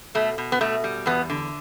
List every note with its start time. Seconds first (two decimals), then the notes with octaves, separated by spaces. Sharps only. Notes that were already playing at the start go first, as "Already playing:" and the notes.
0.15 B2 A3
0.38 B2
0.52 B3
0.61 B2 A3
0.84 G3
1.06 E2 B3
1.30 D3